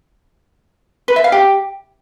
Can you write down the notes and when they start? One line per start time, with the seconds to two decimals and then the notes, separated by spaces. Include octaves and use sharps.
1.08 B4
1.16 E5
1.24 F5
1.32 G4